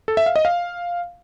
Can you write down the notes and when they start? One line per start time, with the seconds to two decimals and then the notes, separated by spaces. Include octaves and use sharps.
0.08 A4
0.17 E5
0.26 F5
0.36 D#5
0.45 F5